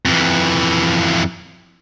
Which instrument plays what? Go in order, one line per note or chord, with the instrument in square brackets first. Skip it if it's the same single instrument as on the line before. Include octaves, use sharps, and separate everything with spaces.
[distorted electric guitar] F2 E3